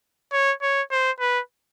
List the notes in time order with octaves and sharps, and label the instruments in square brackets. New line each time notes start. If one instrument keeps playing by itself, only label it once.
[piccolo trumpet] C#5
C#5
C5
B4